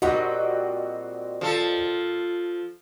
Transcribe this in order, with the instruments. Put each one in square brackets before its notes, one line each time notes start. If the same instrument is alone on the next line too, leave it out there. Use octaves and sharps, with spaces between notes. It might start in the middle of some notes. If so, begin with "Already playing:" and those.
[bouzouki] A#2 G3 C4 [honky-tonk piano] F#4 D#5 F#5
[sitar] F3 A4